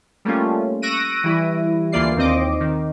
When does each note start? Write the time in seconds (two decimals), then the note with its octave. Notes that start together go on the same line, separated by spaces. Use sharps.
0.25 G3 A3 A#3 C#4 F4
0.82 C#6 E6 F#6 A#6 D7 D#7
1.24 E3 G3 E4
1.92 D2 E3 A#3 F4 D5 C7
2.17 D#2 C4 D#5 D6
2.60 D#3